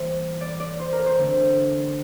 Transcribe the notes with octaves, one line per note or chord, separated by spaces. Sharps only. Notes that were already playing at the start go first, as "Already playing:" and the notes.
Already playing: E3 G3 A#3 C5
D5
D5
C5
A#4
C5
D3 A3 C4